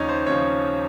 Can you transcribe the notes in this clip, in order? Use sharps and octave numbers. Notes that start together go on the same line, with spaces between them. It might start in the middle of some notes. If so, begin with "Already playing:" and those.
Already playing: D#2 C#3 F3 C#4 D#4
C5
D#2 C#3 F3 C#5